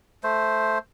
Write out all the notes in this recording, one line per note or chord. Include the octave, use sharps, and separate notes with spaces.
A3 C5